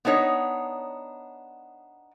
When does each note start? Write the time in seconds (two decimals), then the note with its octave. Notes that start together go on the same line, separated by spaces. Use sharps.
0.05 B3 D4 D#4 C#5